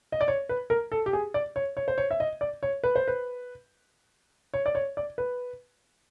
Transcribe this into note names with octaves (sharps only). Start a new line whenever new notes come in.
D#5
D5
C#5
B4
A#4
A4
G4
G#4
D5
C#5
C#5
C5
C#5
E5
D#5
D5
C#5
B4
C5
B4
C#5
D5
C#5
D5
B4